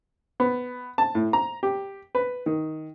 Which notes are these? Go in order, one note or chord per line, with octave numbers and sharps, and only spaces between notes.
B3
A5
A2
A#5
G4
B4
D#3